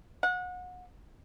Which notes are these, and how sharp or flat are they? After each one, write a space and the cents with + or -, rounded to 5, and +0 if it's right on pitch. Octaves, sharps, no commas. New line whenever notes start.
F#5 -30